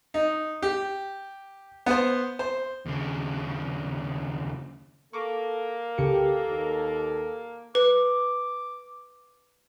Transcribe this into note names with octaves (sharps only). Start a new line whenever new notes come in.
D#4
G4
B3 C5
C5
D#2 C#3
A#3 A4 C#6 D6
C2 C#3 G4 A4 C#7
D#2
B4 D6